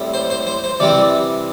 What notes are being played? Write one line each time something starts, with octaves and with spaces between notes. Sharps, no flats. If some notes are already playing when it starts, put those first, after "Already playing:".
Already playing: A2 G3 C4
C5
C5
C5
C5
C3 E3 G3 C4 D5